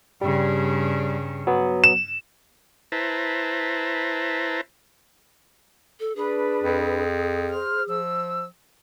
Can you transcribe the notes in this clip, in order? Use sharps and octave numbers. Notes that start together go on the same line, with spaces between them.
G2 C#3 G3
F#3 B3
E7
E4 B4 C5 A5 A#5
A4
D4 G#4 B4
F2
C5 F6
F3 E6